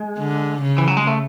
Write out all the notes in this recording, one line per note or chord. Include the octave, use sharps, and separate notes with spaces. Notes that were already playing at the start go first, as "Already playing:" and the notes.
Already playing: G#3
D3
C#3
E3
F#3
G#3
A3